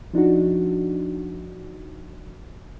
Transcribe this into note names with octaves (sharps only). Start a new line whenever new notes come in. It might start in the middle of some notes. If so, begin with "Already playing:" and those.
F3 D4 D#4 F#4